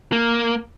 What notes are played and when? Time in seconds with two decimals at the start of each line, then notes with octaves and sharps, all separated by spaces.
0.12 A#3